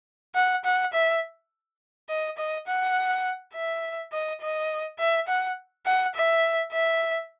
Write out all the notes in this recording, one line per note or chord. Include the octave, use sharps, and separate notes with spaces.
F#5
F#5
E5
D#5
D#5
F#5
E5
D#5
D#5
E5
F#5
F#5
E5
E5